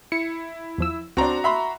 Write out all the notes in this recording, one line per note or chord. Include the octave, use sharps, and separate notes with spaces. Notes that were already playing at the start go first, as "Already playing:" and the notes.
E4 C#7
E2 F3 E6
C#2 C4 D4 F#4 A#5
E5 B5 C6